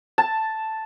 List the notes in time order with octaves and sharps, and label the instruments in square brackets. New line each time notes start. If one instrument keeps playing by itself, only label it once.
[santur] A5